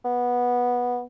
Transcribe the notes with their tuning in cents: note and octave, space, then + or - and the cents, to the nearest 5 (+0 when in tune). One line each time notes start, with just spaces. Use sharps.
B3 -10